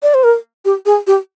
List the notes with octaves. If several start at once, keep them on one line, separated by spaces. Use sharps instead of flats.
D5
C5
A#4
G4
G#4
G4